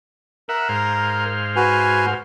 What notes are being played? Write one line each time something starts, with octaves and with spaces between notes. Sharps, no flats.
A#4 E5 F#5
G#2 C5 F5
F#4 B4 G#5